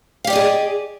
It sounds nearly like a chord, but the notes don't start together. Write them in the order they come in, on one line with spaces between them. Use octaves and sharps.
F5 G4 D5 D#5 G#4